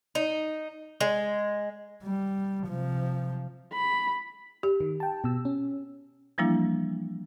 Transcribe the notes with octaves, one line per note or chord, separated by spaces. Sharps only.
D#4
G#3
G3
C3 F3
B5
G4
D#3
G5 A5
B2 E6
C#4
E3 F3 G3 A#3 D4 E4